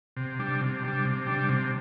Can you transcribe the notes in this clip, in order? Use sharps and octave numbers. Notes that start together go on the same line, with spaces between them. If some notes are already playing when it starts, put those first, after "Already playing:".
C3
G3 D4
C3
G3 D4
C3
G3 D4
C3